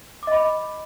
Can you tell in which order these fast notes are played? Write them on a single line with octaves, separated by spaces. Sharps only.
D6 D#5 B5